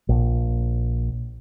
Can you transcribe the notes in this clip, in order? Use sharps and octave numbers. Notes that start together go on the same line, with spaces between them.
A#1